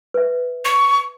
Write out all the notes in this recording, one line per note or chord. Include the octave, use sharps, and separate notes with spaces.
B4 E5
C#6